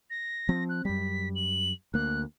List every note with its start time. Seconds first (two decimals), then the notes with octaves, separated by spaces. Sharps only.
0.10 A#6
0.49 F3 C4
0.69 F#6
0.85 F#2 G3 B6
1.35 F#7
1.94 D2 A#3 F#6